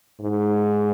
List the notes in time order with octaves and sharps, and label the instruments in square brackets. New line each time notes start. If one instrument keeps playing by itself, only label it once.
[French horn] G#2